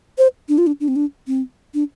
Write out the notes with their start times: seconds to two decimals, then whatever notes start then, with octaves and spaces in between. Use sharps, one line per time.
0.18 C5
0.49 D4
0.58 F4
0.67 D4
0.80 D4
0.88 C4
0.96 D4
1.27 C4
1.74 D4